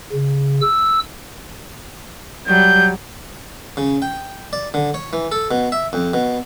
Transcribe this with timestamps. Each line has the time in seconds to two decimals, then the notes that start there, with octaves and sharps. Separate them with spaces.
0.12 C#3
0.61 E6
2.47 F#3 G3 G6
3.77 C#3
4.02 G5
4.53 D5
4.74 D3
4.94 C#5
5.13 E3
5.32 A4
5.51 B2
5.72 E5
5.93 F2
6.14 B2